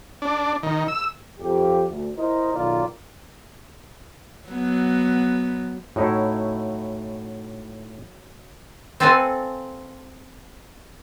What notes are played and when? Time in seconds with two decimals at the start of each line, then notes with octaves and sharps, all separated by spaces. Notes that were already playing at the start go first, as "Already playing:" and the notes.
0.22 D4
0.63 D#3
0.88 E6
1.39 F2 G4
1.88 D2
2.17 E4 A#4 C5 D#5
2.53 B1 D#3 F4 A#4 D5
4.49 F#3 B3
5.96 A2 D#4 E4 F#4 C#5
9.00 C4 A4 B4 F5 F#5 G#5